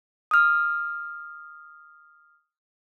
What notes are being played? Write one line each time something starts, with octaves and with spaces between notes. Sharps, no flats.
D#6 F6